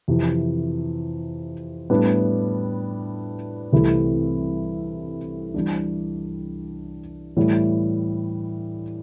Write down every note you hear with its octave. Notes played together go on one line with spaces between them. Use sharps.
F2 C3 E3
A2 G3 B3 D4
C2 C3 E3 A3 E4
E3 G3 D4
A2 E3 G3